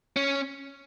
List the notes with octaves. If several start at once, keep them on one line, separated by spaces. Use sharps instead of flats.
C#4